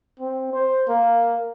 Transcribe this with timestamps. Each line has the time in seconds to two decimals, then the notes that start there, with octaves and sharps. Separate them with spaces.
0.20 C4
0.53 C5
0.88 A#3